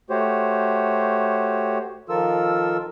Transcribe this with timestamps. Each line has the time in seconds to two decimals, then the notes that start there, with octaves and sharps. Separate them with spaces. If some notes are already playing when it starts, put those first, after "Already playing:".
0.10 A3 F#4 G4 C5 C#5
2.09 D#3 F3 F4 A4 A#4 E6